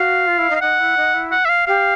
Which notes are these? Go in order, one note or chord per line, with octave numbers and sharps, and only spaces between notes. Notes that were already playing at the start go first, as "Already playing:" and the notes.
Already playing: F#4 F5
F4
E4
D#4
F5
D#4 F#5
E4
D#4
E4
F#5
E5
F5
G4 F5